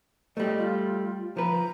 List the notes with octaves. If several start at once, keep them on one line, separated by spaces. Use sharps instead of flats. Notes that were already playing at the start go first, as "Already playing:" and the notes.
G3 A3 D#5
F4
F3 B4 A#5